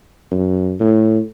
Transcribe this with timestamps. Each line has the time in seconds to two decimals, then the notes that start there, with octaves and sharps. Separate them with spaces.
0.31 F#2
0.80 A2